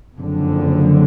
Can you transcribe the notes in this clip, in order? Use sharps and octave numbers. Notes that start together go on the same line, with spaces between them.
F#1 F2 D3